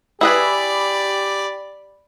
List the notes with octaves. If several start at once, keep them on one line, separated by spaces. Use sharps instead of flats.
E4 G4 G#4 B4 D5 B5